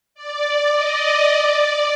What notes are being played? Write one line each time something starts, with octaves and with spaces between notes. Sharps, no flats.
D5
D#5
D5
D5